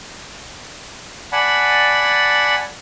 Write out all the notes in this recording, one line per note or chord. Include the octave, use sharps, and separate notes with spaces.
D5 F#5 G#5 A5 B5